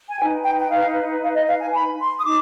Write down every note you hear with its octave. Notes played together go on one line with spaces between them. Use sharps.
G#5
D#4 B4 G5
G5
G5
F5
F5
D#5
F5
G#5
B5
C6
D#6
D#4 D6